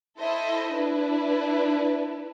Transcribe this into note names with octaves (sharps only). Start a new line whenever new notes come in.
E4 A4 C5 D#5 E5
D4 E4 B4